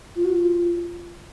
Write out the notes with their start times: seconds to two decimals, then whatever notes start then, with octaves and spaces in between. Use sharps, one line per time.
0.16 F4
0.25 F#4
0.32 F4